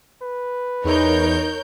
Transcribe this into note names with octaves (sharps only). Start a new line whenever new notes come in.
B4
E2 D#4 A#4 C#5 G6